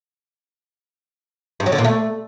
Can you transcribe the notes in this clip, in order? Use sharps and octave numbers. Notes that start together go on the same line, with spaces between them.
G2
F#3
D3
A#2
A3